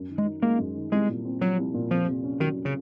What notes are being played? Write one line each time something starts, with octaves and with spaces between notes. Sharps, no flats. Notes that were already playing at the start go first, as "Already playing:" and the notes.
Already playing: F#2
D#3
G#3
D#4
G#3 A#3
F#2
D#3
C2 G#3
A#2
C4
F3 F#3
C2
A#2
F2 F3
C3
C#4
D#3 F#3
C#3